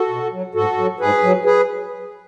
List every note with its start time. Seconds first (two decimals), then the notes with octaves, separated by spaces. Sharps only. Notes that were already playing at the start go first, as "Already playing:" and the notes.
Already playing: F#4 A4
0.09 B2
0.32 F#3
0.55 G#2 F#4 A4
0.77 F#3
1.00 G#2 G#4 B4
1.23 F#3
1.45 G#4 B4